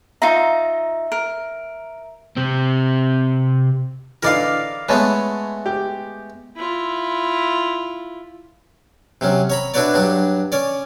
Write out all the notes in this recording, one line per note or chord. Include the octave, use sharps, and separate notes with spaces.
D#4 F4 E5 A#5
A#4
C3 C4
D3 E3 D#4 A#4 D5 F5
G#3 A3 B3 B4 C#5 A5
G4
E4 F4
C3 F#3 C#4
C#5 A#5 B5
D4 E4 F#4 B4 C#5 D5
G2 F#3 D4
C#4 C#5 D5